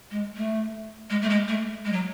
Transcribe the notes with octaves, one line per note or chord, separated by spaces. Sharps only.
G#3
A3
G#3
A3
G#3
A3
G#3
F#3